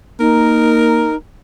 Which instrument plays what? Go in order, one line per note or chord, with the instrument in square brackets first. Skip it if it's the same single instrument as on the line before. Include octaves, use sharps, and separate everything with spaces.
[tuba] A#3 [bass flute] D#4 [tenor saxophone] A#4